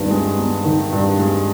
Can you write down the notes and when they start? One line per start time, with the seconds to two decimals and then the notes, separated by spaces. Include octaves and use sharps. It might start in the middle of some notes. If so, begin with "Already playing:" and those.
Already playing: G2 D#3 B3
0.11 G#3
0.38 B3
0.65 D#3
0.92 G2
1.19 G#3